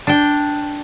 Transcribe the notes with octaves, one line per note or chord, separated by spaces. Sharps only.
D4 G5